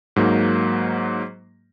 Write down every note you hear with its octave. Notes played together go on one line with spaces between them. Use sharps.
G#2 F#3 A#3